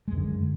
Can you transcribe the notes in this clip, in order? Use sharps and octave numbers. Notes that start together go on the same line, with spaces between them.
F#2 D3 G#3